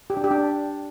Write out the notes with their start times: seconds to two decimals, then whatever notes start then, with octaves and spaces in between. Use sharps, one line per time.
0.10 G4
0.17 D4
0.24 G4
0.31 D4